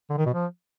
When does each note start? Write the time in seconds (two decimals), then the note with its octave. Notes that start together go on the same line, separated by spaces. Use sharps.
0.10 D3
0.18 D#3
0.26 B2
0.34 F3